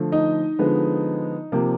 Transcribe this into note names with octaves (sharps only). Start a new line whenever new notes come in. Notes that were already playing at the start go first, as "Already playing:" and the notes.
Already playing: D3 F3 A3
D#4 D#5
D3 F3 G#3 B3
C3 F3 A#3